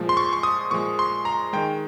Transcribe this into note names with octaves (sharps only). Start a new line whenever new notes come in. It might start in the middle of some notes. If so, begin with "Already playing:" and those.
Already playing: A#2 F3 G#3
C6
C#6
C#6
D#6
A#2 F3 G#3 C#6
C6
A#5
D#3 G#3 G5